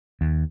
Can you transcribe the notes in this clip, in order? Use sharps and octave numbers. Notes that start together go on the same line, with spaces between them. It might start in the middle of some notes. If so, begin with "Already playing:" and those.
D#2